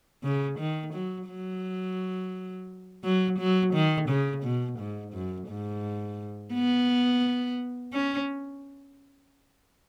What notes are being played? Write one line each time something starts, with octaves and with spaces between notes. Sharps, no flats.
C#3
D#3
F#3
F#3
F#3
F#3
D#3
C#3
B2
G#2
F#2
G#2
B3
C#4